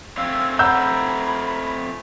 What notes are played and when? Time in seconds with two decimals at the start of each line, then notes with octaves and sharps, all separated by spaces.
0.17 A3 C4 F5 E6
0.59 F#5 A#5 B5 E6 G6